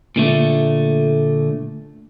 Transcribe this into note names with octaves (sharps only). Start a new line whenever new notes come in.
A#2 D3 A3